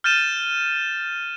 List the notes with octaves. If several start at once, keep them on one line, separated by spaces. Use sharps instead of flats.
F6 G6 A6 D#7 E7